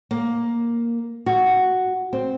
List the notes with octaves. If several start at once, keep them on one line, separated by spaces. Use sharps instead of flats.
A#3
F#4
C4